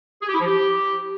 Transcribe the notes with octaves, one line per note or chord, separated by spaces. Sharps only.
G#4
G4
E4
F3
G4